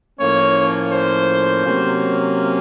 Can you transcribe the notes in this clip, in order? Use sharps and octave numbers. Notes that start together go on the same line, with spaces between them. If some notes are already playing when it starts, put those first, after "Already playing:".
A2 F3 A#3 C#4 C#5
C5
C3 F#3 A#3 C#4